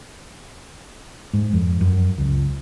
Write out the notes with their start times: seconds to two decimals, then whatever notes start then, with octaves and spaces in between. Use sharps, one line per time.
1.33 G#2
1.53 F2
1.81 F#2
2.18 C#2